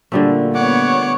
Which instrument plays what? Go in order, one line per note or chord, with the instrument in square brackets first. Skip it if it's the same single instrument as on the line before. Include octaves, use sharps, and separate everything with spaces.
[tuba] A#2 [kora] D3 G3 A3
[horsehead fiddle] B3 C#5 [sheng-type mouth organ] F#5 D6